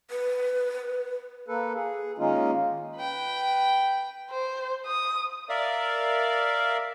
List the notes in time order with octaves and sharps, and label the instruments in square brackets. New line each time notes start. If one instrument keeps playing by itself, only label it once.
[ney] B4
[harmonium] A#3 A4 B4
G#4
D#3 G#3 A#3 C#4 D#4 F4
[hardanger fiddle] B4 G5
[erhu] C5
D#6
[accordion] A#4 D5 E5 F5